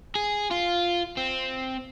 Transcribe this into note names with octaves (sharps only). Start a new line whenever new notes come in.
G#4
F4
C4